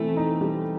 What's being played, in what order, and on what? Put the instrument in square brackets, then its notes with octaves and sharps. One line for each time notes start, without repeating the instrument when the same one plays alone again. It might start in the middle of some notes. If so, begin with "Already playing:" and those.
Already playing: [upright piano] E3 C4 [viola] A3
[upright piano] D#4
[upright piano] G3 [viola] A3